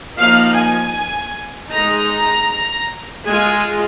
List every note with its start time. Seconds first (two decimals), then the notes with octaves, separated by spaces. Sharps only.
0.18 F3 A#3 D#4 F5
0.56 G#5
1.72 G#3 D#4 A#5
3.27 G#3 F4 G#5